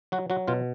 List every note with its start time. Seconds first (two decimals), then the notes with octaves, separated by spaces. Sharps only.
0.12 F#3 F#4
0.30 F#3 F#4
0.48 B2 F4